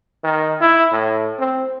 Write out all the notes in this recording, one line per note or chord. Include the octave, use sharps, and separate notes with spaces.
D#3
E4
A2
C4